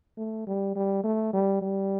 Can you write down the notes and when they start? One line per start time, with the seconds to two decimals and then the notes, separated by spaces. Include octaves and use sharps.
0.18 A3
0.47 G3
0.76 G3
1.04 A3
1.33 G3
1.62 G3